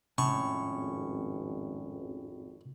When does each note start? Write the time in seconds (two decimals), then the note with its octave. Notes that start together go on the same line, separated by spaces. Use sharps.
0.18 G#1 F2 A2 C#4 C#6